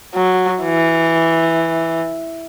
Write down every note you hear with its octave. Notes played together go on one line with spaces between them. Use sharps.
F#3
E3